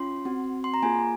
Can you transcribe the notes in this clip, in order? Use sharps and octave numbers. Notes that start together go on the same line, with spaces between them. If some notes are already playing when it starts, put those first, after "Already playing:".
Already playing: C#4 F4 C6
C4 F#4
C6
A#5
A#3 F4 G#4 G#5